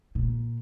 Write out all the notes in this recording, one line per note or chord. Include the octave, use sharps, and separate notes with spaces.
A#2